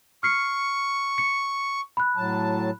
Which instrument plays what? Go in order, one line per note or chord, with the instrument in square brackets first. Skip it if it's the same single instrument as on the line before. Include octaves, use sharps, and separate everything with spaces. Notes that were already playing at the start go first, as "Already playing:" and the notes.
[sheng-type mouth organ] C#6 [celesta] F6 C7 C#7
[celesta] C#7
B5 F#6
[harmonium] A2 F#3 A5